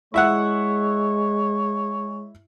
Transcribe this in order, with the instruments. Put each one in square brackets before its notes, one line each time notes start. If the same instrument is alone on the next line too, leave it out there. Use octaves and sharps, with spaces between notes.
[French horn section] G#3 [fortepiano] E4 E5 F#5 [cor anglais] C#5